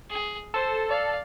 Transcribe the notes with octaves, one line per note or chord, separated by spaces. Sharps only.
G#4
A4 C5
D5 F5